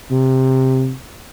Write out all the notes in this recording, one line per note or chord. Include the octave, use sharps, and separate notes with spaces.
C3